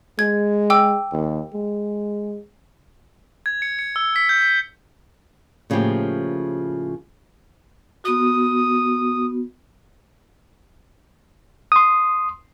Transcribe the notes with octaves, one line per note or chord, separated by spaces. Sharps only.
G#3 G#6
G5 D6 E6
D#2
G#3
G#6
C#7
C#7
E6
B6
G6
B6
A2 C#3 F3 A#3 G4
B3 F#4 D#6
C6 D#6